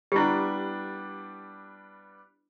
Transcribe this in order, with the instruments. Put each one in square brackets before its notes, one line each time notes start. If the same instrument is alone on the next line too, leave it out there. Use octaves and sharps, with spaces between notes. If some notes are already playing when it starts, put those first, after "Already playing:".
[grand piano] G3 B3 D4 [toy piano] E4 G4